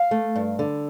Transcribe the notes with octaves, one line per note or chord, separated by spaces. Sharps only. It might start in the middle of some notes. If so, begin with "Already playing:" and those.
Already playing: F5
A3
G2
D3